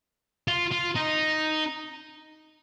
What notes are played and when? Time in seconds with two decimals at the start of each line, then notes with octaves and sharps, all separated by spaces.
0.48 F4
0.72 F4
0.96 D#4